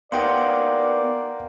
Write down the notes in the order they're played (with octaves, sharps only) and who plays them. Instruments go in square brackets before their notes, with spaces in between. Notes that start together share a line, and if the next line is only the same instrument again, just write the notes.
[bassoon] A#3 [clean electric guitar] B3 D#4 G4 [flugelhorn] D5 [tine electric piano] F#5 G5 C6